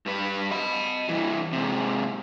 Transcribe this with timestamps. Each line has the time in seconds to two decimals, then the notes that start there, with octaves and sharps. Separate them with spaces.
0.06 G2 B4
0.51 D#5 B5
1.09 G2 E3
1.53 G#2 C3